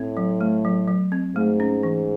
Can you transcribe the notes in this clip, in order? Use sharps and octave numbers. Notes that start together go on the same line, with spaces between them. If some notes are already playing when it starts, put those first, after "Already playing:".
Already playing: A2 C4
F#3
A3
F#3
F#3
C4
G#2 A3
C#4
E3